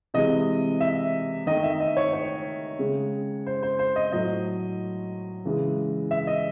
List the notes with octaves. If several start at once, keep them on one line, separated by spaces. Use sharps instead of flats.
C3 E3 G#3 D#5
E5
D#3 A3 D#5
E5
D#5
C#5
C#5
C#3 G#3
C5
C5
C5
D#5
A2 F#3 A3 D#5
C#3 E3 G#3
E5
D#5